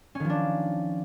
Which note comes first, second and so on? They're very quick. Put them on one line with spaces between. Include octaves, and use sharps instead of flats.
C#4 D#3 F3 D4